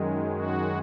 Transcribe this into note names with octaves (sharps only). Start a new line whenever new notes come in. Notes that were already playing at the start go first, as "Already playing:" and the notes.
Already playing: F#2 D#3 G#3
F#4